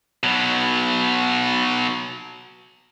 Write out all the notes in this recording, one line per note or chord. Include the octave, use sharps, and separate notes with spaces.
B2 F#3